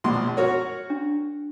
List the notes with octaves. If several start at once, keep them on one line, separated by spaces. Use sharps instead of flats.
A#1 B2 C6
F#4 A#4 C#5
D4